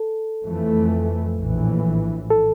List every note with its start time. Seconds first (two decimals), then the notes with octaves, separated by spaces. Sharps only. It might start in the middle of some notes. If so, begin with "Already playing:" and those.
Already playing: A4
0.43 F2 E3 A3
1.37 A#1 A2 E3
2.30 A4